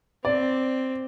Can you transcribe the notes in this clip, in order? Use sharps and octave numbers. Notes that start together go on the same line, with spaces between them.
C4 D5